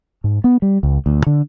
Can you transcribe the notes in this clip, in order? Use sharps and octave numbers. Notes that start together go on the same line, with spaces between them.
G#2
B3
G3
C#2
D2
D3